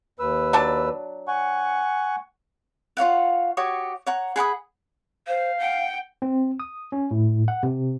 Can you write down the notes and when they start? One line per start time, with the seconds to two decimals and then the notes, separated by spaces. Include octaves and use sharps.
0.19 D#2 B4 E6
0.53 F#3 D4 A5
1.28 F#5 G#5 C#6
2.97 F4 C#5 F5 F#5
3.57 F#4 G4 C#5 D#6
4.06 C#5 F#5 A#5
4.36 G#4 F#5 B5 D#6
5.27 C5 F5
5.60 F#5 G5
6.22 C4
6.60 D#6
6.92 C#4
7.11 A2
7.48 F#5
7.63 C3